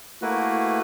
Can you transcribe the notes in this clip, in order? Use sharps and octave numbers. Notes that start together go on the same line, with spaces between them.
A3 A#3 E4 F#4 B4